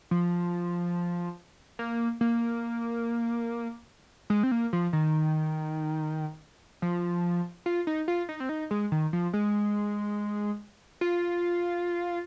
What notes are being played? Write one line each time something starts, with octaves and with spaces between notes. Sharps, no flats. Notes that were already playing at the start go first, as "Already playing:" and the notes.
F3
A#3
A#3
G#3
C4
A#3
F3
D#3
F3
F4
D#4
F4
D#4
C4
D#4
G#3
D#3
F3
G#3
F4